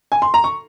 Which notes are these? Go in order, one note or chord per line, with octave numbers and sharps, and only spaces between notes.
G#5
C6
A#5
C#6